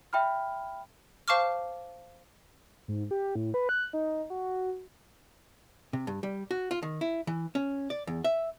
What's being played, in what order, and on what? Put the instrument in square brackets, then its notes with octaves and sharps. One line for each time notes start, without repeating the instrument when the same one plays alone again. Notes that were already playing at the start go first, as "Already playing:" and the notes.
[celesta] E5 G5 B5 F6
[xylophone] C5 F5 A5 C#6 D6 F6
[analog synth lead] G#2
G4
A2
B4
F#6
D#4
F#4
[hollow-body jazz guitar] C3
G2
G3
F#4
F4
D#3
E4
E3
C#4
D5
E2
E5